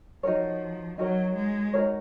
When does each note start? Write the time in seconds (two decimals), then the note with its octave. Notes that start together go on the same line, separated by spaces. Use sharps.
0.23 F3 D#4 F#4 A#4 C#5
0.98 F#3 D#4 F#4 A#4 C#5
1.36 G#3
1.74 D#4 F#4 A#4 C#5